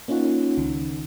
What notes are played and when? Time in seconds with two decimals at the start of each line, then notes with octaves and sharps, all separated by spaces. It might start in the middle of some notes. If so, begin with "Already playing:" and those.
0.08 A#3 C#4 D#4 F4 C#5 F#5
0.57 C#2 D#3